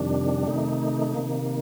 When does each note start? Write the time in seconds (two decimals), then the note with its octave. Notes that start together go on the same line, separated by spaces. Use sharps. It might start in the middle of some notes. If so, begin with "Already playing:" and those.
Already playing: F2 C3 D#3 G3 D4
0.47 C3 D#3 A3 D#4
1.14 C3 D#3 A#3